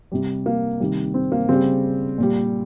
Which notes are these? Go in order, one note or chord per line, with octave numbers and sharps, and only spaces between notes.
C3 G3
A#3
C3 D#3 G3
C4
A#3
C#3 G3 C4
A#2 G3